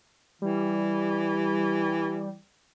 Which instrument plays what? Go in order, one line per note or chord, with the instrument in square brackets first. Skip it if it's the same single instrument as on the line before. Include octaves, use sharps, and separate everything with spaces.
[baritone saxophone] E3 [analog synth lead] G3